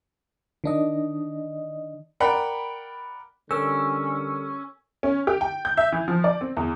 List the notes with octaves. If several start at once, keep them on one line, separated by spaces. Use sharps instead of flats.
D#3 D4 D#5
A#4 D5 F#5 G5 B5
D3 G3 C#4 A4 A#4 E6
C#4
G4
G5
G6
E5
E3
F3
D5
C4
E2